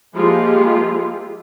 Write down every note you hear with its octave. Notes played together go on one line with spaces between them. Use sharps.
F3 G#3 A#3 E4 F4 G4